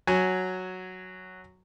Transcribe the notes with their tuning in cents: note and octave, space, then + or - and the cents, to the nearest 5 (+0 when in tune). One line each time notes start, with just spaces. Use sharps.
F#3 +0 F#4 +0 G#5 +10